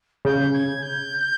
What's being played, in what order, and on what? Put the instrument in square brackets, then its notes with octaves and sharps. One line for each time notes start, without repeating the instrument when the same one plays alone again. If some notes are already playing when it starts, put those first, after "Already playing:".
[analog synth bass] C#3 [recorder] G6
[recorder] G#6
G6